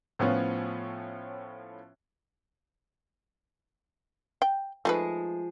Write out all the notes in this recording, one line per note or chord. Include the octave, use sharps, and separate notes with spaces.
A2 F3 B3 C#4 F4
G5
F3 G#3 A3 D#4 B4